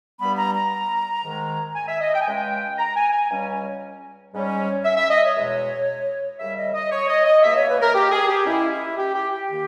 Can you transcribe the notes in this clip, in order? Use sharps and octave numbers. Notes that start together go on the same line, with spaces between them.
G2 G3 B3 B5
A#5
A#5
G#2 D#3 G#3
G#5
E5
D#5
G5
G#5
C#2 C#3 G#3 C#4 G5
A#5
G#5
G#5
C#2 C#3 G3 C#4
G#2 G3 C#4
E5
E5
D#5
C#5
E2 B2 G#3
D#2 C#3 G3 E5
D#5
D#5
C#5
D#5
D#5
C#2 B2 A#3 E5
C#5
B4
A#4
G4
G#4
G4
A#2 G#3 C#4 E4
E4
G4
G4
G4
D#3 A#3